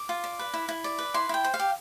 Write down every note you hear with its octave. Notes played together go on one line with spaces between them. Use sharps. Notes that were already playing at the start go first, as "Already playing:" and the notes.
Already playing: D6
F4
D5
B4
E4
E4
D5
B4
E4 C6
E4 G5
C5
F5
G4